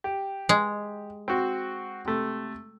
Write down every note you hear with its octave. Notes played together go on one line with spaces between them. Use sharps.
G4
G#3
C4 F#4
C3 A3